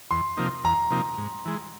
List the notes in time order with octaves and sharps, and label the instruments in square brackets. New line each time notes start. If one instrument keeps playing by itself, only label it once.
[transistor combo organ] E2 [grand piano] C6
[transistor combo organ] C3 F3 A#3 D#4
[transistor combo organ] E2 [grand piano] A#5
[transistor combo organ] C3 F3 A#3 D#4
G#2
E3 G#3